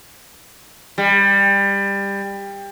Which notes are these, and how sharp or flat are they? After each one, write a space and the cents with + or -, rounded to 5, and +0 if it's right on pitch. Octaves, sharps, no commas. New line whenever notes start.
G3 +20